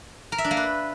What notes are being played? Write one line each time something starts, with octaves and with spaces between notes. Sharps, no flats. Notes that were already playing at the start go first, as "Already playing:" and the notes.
A#4
E5
D4
A#3
B4